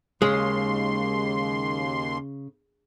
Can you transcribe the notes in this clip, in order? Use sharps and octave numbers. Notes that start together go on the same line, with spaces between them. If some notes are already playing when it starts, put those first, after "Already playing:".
D#2 C#3 G#3 C6